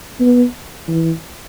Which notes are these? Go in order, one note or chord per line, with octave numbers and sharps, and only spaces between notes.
B3
E3